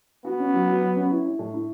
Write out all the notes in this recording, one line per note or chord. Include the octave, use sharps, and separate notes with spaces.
B3 F#4
C#4
F#3
F#4
F#3
C#4
E4
E4
A2
E4